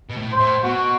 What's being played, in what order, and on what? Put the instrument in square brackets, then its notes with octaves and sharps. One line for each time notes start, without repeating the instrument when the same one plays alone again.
[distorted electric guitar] B2
A2
[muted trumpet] C5
[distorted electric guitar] A2
[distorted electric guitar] B2 [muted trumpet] F#4